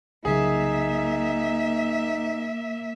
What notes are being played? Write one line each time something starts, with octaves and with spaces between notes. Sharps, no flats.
C2 C#3 F#3 A#3 D#4 G#4 E5